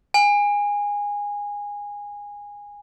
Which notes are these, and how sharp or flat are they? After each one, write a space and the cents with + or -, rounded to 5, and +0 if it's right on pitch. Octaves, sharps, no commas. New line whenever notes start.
G#5 -20